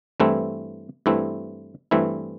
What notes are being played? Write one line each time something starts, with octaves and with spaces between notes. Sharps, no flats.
G2 E3 A3 C4 E4
G2 E3 A3 C4 E4
G2 E3 A3 C4 E4